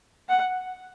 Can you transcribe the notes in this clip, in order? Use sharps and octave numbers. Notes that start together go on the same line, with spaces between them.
F#5